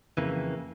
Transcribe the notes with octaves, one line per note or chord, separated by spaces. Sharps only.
F2 C#3 E3 A#3